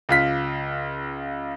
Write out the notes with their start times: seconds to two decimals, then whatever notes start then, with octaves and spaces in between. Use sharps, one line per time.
0.09 C#2 F4 B6